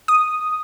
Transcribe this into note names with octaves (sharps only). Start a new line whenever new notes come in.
D#6